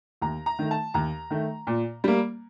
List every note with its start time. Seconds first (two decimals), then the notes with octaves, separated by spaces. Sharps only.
0.22 D#2 A#5
0.46 A#5
0.59 D#3 A3
0.71 A5
0.94 D#2 A#5
1.31 D#3 A3
1.67 A#2
2.04 G3 A#3